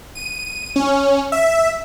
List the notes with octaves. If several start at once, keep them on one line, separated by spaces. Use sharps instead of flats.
D#7
C#4
E5